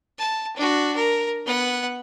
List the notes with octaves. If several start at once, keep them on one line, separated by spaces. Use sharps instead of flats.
A5
D4 F#4
A#4
B3 F#5